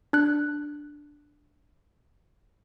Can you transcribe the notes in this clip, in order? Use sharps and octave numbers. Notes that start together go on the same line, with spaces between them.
D4 F#6